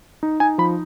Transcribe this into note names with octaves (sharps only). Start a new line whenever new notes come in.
D#4
D#4 G#5
F3 B5